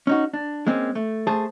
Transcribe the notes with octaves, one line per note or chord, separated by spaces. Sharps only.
C#4 D#4 F#4
D4
G#3 A#3 C4 C#4
A3
A3 G#4 C5 A5